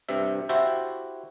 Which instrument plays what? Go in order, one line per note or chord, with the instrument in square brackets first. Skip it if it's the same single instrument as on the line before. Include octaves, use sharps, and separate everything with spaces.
[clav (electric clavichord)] G2 C3 E5
E4 F#4 G4 C5 E5